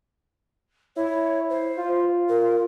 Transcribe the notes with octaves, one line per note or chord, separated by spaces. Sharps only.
E4 C#5
C5
F4
A#4